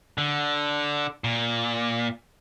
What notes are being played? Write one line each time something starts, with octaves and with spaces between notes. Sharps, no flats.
D3
A#2